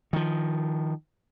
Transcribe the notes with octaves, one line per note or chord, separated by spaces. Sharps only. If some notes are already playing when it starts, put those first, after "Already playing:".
D#3 F3